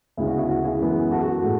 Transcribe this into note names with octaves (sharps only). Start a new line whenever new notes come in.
D2 C#3 G#3 B3 E4
F#4
E4 G#4
F#4
E4 G#4
F#2 E3 G#3 B3
F#4 A4
F#4 A4
F#4
A2 G#3